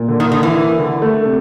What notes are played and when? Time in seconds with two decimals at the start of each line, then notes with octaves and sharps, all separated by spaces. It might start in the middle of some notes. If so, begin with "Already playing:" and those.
Already playing: A#2
0.08 D3
0.20 D#3
0.31 D3 D#3
0.43 E3
0.55 A#3
0.78 D3
1.02 A3
1.25 C3